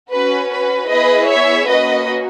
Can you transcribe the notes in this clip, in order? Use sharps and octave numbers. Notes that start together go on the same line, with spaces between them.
C#4 F#4 B4
B4
B3 E4 G#4 B4 D#5
C#5 E5
A#3 C#4 F#4 B4 D#5